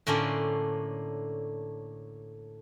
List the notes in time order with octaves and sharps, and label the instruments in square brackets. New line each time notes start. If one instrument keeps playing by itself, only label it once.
[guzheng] A2 D3 A#3 C#4 D4 F4